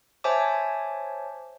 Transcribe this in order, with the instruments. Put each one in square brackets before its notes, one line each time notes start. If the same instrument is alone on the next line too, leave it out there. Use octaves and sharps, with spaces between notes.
[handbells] C5 C#5 E5 G#5 A5 D6